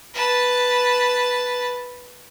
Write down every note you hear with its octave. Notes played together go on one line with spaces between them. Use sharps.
B4 A5